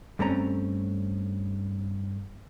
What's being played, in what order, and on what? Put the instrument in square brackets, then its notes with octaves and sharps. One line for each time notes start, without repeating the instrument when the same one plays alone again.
[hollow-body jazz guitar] G2 A3 C4 C#4 A#5